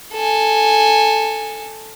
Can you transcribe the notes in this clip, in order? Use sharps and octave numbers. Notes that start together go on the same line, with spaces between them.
A4 G#5